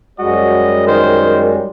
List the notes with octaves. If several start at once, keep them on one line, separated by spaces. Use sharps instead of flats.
F#2 G3 G#3 F#4 D#5
D#3 C5